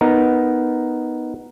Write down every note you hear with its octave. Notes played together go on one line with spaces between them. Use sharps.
B3 D#4 A#4